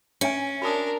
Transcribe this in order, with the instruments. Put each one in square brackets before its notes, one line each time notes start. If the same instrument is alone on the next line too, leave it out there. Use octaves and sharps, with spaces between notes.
[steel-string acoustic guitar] C#4 [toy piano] C#5 E5 G#5
[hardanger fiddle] D4 A#4 [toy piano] F#4 D#6